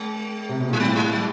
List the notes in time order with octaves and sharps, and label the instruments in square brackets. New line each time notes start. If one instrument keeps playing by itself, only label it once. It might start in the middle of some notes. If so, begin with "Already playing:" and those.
Already playing: [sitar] G#3
[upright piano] C3
B2
A#2
[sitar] G3
[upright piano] A2 [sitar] F#3
[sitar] G3
F#3